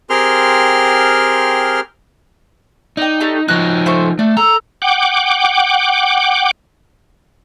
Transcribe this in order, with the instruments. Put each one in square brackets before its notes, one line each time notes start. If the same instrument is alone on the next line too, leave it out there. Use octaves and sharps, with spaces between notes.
[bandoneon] C4 G4 G#4 A#4 C6 F6
[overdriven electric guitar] D#4 [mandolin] D5 G5
[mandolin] A3 D4 G4
[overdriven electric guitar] F3 D#4 [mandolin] F#4 F#6
[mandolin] A3 C5 C#6
[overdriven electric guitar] A3 [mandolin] D4
[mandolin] A4 [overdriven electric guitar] A#5
[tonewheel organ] F#5 G5 D6